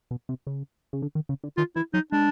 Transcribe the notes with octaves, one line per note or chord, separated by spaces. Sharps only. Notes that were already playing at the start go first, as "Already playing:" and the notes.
B2
C3
C#3
C#3
D3
D#3
C#3
D3
D#3 F4
E3 E4
F#3 D#4
G#3 D4